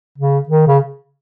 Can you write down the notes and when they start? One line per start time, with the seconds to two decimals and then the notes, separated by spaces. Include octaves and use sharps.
0.18 C#3
0.49 D#3
0.67 C#3